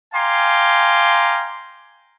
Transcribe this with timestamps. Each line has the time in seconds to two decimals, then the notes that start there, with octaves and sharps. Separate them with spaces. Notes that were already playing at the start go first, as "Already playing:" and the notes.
0.14 F5 G5 G#5 A#5 C6 D6